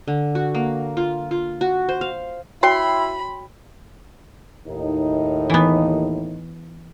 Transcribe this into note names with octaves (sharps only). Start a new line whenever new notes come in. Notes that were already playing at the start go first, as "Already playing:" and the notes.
D3
F#4
A#3
F4
F4
F#4
C5
F5
E4 F#4 C#5 G5 B5 C6
D#2 A2 D#4
E3 B3